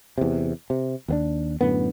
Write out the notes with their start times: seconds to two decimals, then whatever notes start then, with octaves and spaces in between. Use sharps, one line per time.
0.18 E2 C3
0.70 C3
1.08 D#2 B3 D4
1.61 F#2 A2 D3 B3